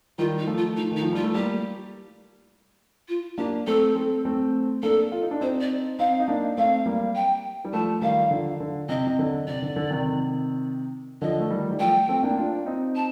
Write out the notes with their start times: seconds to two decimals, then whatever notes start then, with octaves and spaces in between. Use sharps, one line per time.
0.18 D#3 G3 F4
0.38 D#4
0.47 F3 A3
0.57 F4
0.76 D#4
0.91 D#3 D#4
1.02 F3
1.13 G3 F4
1.24 A3
1.35 G3 A#3 G4
3.08 F4
3.38 A#3 D4 G4
3.67 A3 C4 A4
3.95 A3 C4
4.25 A3 C4
4.82 A#3 D4 A4
5.12 F4
5.22 D#4
5.31 D4
5.41 C4 D#4 C5
5.60 D5
5.99 C4 D#4 F5
6.19 D#4
6.28 A#3 D4
6.57 A3 C4 F5
6.86 G3 A#3
7.15 G5
7.65 G3
7.73 F3 A3 A5
8.02 D#3 G3 F5
8.31 D3 F3
8.60 D3
8.89 C3 D#5
9.07 C3
9.19 D3
9.47 C3 D5
9.62 D3
9.76 D3
9.91 C3 D#3
11.22 D3 F3 D#5
11.40 A3
11.50 D#3 G3
11.71 G3
11.79 F3 A3 G5
12.08 A3 C4
12.23 A#3 D4
12.37 D4 F4
12.66 C4 D#4
12.96 A5